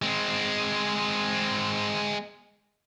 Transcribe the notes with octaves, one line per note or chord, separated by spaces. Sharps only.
G#3 C4